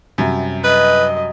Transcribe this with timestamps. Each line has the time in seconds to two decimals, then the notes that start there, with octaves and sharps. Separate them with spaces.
0.18 F#2 C3 F#3 G3
0.64 B4 D#5